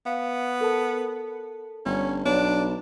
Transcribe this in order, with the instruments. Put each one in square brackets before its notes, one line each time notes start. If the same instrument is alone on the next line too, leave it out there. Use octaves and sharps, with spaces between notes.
[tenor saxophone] B3 [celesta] F5
[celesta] A4 A#4 A5
[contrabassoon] G1 [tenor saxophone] C#4
[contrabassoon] B1 [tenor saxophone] D4 [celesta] C#5